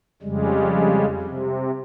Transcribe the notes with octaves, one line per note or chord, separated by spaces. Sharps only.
F2 C#3 G3 G#3
C3